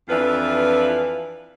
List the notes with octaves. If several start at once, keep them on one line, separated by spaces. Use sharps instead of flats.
F2 E3 D4 F4 B4